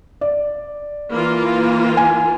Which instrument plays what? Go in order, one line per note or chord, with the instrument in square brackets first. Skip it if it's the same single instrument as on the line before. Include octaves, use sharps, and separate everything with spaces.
[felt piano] D5
[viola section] E3 A#3 F4
[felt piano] G#5